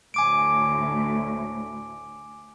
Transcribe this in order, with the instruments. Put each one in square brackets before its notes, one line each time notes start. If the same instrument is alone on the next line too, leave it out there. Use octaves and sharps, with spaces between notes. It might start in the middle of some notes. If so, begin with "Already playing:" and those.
[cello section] D2 A2 [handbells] G#5 D6 D7